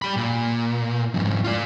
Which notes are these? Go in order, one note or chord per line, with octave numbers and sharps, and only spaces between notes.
G3 B5
A#2
F2 G#2
F4 D5